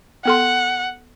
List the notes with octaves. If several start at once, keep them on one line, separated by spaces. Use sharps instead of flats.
B3 A4 F#5 C6